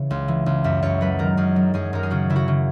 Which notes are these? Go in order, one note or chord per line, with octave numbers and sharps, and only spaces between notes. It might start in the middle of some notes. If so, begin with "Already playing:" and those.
Already playing: C#3 E3 C#5
C#2
E3
C#2
F#2 E5
F#2 C#5
F#3 B4
D#3 A#4
F#2 G#4
F#3
F#2 G#4
F#2 A#4
G#4
C#3 F#4
C#3 E4
F#4
C#3